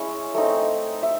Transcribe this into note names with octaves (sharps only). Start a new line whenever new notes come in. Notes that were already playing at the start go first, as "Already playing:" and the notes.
Already playing: G#3 C#4 E4 C#5
A3 C4 D#4
E5